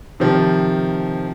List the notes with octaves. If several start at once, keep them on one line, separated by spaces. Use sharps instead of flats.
C3 D#3 F3